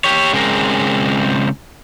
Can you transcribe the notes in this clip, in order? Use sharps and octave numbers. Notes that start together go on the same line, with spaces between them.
G4 C#5
C#3 G#3 C4 A#4